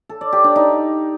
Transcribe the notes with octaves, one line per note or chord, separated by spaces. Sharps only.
A4
D5
G4
D4
D#4